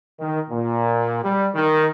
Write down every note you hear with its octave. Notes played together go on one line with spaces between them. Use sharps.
D#3
A#2
G3
D#3